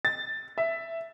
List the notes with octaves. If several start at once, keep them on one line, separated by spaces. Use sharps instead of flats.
A6
E5